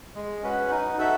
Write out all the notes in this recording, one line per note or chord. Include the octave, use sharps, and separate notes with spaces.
G#3
C#4 F#4 B4
D#4
F#4 A4 E5